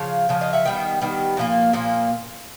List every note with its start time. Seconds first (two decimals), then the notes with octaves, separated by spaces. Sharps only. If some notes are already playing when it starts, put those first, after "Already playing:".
Already playing: C#3 F3 F5
0.29 C#3 F3
0.41 D#5 F5
0.53 E5 F#5
0.65 D#3 G3 B3 G5
1.01 D#3 G3 B3
1.37 A#2 F3 A#3
1.73 A#2 F3 A#3